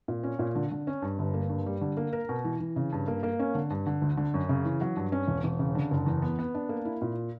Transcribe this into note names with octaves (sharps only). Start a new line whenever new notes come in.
A#2
C#4
A#2
D3
D3
C#4
G2
G1
A#3
G2
G3
D3
A#3
A#4
B2
E3
E3
C#3
G2
A#3
A#3
C#4
D3
G2
D3
D2
D3
F#2
C#3
E3
F#3
G2
C#4
E1
E1
C#3
D3
F#1
E2
B3
B3
D4
A#3
E4
A#2